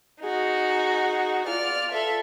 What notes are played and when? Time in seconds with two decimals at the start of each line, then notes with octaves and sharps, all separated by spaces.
0.23 D#4 F#4 G#4
1.47 F4 D5 F6
1.92 A4 E5